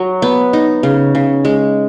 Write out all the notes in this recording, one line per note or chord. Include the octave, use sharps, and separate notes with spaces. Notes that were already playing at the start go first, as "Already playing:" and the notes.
Already playing: F#3
B3
D#4
C#3
C#3
G#3